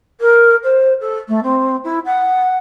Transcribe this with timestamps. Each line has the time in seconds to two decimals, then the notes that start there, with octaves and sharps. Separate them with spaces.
0.21 A#4
0.64 C5
1.01 A4
1.28 A3
1.43 C4
1.84 E4
2.06 F#5